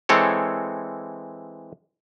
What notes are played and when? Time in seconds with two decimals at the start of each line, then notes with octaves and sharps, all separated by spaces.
0.09 E3 G#3 C4 A4 C#5